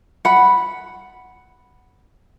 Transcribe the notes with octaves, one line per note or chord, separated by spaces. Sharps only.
F#5 B5